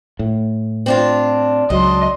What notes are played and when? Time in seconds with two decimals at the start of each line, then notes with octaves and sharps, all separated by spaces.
0.19 A2
0.86 C4 D4 F4
1.70 C#2 F#3 D4 D#5 C6